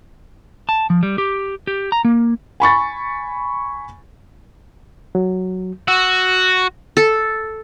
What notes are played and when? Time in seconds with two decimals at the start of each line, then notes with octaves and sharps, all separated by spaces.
0.69 A5
0.90 F3
1.03 G3
1.18 G4
1.67 G4
1.92 A#5
2.05 A#3
2.60 G#5 B5 C#6 A6
5.15 F#3
5.88 F#4 E6
6.97 A4